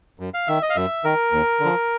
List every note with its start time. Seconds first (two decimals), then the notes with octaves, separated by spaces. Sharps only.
0.19 F#2
0.34 F5
0.48 D#3 E5
0.62 D#5
0.70 F5
0.76 F#2 E5
1.04 D#3 A#4
1.32 D#2
1.60 D3
1.65 F3